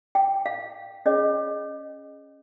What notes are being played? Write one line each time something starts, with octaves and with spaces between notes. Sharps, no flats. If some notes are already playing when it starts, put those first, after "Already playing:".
G5
F5
C#4 G#4 C#5 D#5